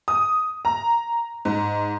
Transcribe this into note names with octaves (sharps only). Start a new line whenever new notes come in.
D#6
A#5
G#2